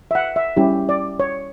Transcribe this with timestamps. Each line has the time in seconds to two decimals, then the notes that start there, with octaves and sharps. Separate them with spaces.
0.11 E5
0.15 F#5
0.36 E5
0.57 G3 C#4 E4 G4
0.89 D5
1.20 C#5